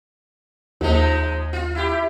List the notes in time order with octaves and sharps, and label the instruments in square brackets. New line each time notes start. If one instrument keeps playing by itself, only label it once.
[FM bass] D#2 [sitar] F3 G#3 D#4
[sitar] F4
E4 G4